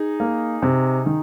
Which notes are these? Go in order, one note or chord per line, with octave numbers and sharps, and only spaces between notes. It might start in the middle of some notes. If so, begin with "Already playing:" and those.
Already playing: D#4 G#4
A#3
C3
D#3